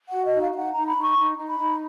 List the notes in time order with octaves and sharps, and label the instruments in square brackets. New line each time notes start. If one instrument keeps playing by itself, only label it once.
[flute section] F#4 F#5
D#5
D#4
F5
F5
D#4 F#5
A#5
D#4
B5
D#4
C#6
D#4
D#4
B5
D#4